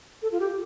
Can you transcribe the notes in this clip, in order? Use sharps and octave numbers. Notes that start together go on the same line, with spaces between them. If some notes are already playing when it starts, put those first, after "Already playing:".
A4
F4
G4